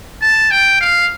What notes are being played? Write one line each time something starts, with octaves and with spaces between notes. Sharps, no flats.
A5
G5
F5